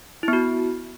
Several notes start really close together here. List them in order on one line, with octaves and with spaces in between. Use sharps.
E4 B3 F#4